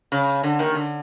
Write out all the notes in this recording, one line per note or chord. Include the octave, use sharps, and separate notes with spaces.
C#3
D3
D#2 D#3
D3